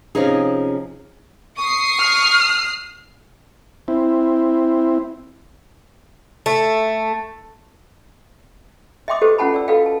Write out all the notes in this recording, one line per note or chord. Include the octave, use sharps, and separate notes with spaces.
C3 F3 C#4 D#4 G#4
C#6 D#6 C7
F6
C4 E4
A3
D#5 E5 G5 C6 D6 D#6
F#4 G4 A4 B4 C5 D#5
C#4 F4 F#5 G5 A5 B5
D5 E6
F#4 A4 B4 D#5 F5 G5
A5